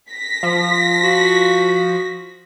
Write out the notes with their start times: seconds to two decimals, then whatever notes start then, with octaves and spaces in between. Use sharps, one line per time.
0.11 A#6 B6
0.43 F3
1.04 F#4